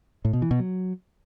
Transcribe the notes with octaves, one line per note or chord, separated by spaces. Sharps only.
A2
B2
E3
B2
F#3